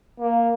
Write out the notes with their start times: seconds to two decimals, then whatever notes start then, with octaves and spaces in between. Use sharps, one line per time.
0.20 A#3